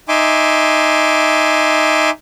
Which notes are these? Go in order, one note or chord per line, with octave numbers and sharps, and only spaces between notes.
D#4 E5 G#5 C6 D6